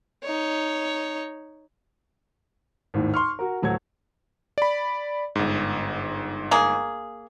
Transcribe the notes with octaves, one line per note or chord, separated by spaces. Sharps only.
D#4 C#5
G#1 D#2 A2
C6 C#6 F6
F#4 A#4
D1 F#3 A3 F#4 G#6
D5 B5
G1 G#2
A#3 G#4